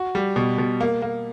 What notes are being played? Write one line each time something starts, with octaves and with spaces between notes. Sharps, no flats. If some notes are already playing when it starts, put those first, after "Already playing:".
Already playing: F#4
G3
B2
B2
A#3
A#3